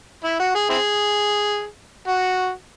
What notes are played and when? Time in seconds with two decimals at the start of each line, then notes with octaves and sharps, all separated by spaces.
0.24 E4
0.39 F#4
0.55 G#4
0.70 C4 E4 G#4
2.08 F#4